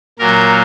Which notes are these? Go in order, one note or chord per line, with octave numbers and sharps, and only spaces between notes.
A#2 F#3 A#3 A#4